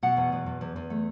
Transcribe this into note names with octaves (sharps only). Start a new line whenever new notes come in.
B2 F#5
E2
B2
E2
E2
E2
A3